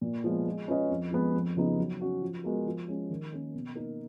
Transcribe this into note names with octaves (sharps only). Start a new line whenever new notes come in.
A#2
F3 G#3 B3
G#3
C#4 F4 B4 D#5
F2
F3 G#3 B3
F2
C#3 F3 B3 D#4
F#3
C#4 F#4
F3
G#3 B3 F#4 A#4
F3
G#3 C#4
D#3
A#3 C#4
B2
A#3 D#4 A#4